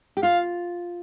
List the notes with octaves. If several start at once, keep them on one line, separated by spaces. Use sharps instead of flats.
G4
F4 F5